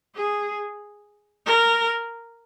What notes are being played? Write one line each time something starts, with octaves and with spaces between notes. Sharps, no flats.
G#4
A#4